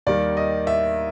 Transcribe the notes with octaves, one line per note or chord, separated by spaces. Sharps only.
D#2 D#3 G3 D5
D#5
E5